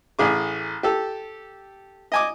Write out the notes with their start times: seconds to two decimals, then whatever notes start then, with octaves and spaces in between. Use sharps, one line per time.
0.19 A1 G#4 D6
0.83 G4 A4
2.12 D#5 G#5 D6